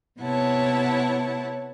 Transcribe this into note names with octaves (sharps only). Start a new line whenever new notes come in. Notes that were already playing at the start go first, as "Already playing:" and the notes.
C3 B3 E4 C#5 F#5 A5